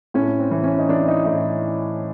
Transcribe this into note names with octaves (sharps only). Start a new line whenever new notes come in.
A2 C#4
C4
E3
C#4
D#4
E3 D4
D#4
A2 D#4